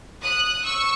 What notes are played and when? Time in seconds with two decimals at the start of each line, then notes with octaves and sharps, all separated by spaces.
0.22 D#6 F#6
0.64 C#6 E6